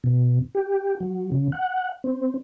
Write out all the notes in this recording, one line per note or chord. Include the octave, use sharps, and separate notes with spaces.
B2
G4
F#3
C#3
F#5
C4